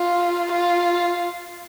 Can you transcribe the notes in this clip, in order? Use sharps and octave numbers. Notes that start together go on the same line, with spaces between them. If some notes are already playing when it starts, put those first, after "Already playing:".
Already playing: F4
F4